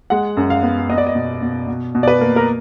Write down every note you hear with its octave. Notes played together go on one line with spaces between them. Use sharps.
G#3 F#5
F#2
F5
B3
B3 D#5
D5
D#5
B2
B2
B2
B2
D5
B4
A#3
A#4